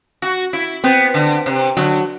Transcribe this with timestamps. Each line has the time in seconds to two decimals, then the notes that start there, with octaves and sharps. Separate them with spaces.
0.22 F#4
0.53 E4
0.84 B3 C4
1.14 D3
1.46 C3
1.77 D3 F#3